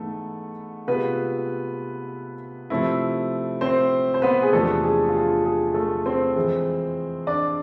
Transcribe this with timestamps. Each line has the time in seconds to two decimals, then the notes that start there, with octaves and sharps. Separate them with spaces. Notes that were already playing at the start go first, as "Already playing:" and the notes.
Already playing: G#2 E3 A3 B3 A4
0.87 C3 G#3 B3 F4 B4
2.70 C3 F3 A3 C4 E4
3.61 C4 C5
4.14 C5
4.22 B3 B4
4.42 G#4
4.53 E2 C3 F3 G#3 A3 D4 A4
4.83 G#4
5.09 F4
5.15 G#4
5.45 G#4
5.74 A3 A4
6.06 C4 C5
6.36 F2 E3 G#3
7.27 D4 D5